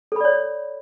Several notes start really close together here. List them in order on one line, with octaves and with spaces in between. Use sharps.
A4 B5 D5 C#5